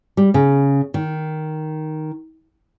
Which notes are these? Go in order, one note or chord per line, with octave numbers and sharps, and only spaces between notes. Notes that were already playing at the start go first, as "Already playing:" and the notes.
G3
C#3
D#3